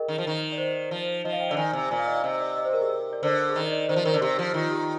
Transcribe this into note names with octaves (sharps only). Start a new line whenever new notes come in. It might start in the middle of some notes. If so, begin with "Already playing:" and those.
Already playing: G#4 A#4 D#5 G5
D#3
F3
D#3
D5
C5
F3
F3 D#5
F5
G5
D3 D5
D#3 G#5
C3
A#2 G#5
F5
D#5
F5
C3 D#5
D5
D#5
C5
A#4
G#4
A#4
D5
D3 C5
G#4
D#3 A#4
D#5
D5
D#3 C5
F3
D#3 A#4
D3
C3 G4
F3
D#3 F4
G4